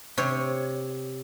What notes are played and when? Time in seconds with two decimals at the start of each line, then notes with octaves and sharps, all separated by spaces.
0.18 C3 C#5